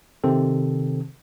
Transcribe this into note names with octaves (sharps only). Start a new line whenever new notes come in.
C3 D#3 C4 A4